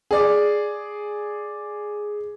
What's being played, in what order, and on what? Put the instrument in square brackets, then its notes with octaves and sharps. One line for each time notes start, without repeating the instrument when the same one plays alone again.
[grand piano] G#4 D5